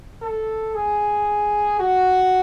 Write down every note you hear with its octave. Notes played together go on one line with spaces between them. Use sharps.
A4
G#4
F#4